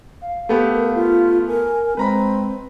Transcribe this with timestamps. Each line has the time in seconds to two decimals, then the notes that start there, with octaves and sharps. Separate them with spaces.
0.21 F5
0.49 A3 B3 G4
0.72 A#4
0.95 F4
1.47 A#4 G#5
1.97 G#3 C4 B4 A#5 B5